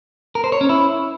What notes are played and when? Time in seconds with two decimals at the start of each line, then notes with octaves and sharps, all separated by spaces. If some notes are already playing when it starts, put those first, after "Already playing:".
0.35 A#4
0.44 C5
0.52 C#5
0.61 C#4
0.69 E4